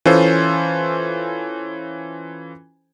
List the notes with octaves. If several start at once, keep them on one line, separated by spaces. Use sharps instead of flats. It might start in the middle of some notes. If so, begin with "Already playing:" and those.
E3 C#4 F4 A4 C5